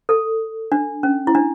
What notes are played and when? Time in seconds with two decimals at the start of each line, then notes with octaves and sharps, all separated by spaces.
0.09 A4
0.72 D4
1.03 C#4
1.27 E4
1.35 D4